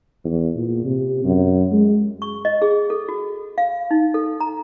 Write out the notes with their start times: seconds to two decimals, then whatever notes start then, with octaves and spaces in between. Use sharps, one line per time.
0.25 E2
0.56 A#2
0.85 C3
1.24 F#2
1.72 G#3
2.22 C#6
2.45 D#5
2.62 G#4
2.90 A4
3.09 F#4
3.58 F5
3.91 D#4
4.14 A4
4.41 A#5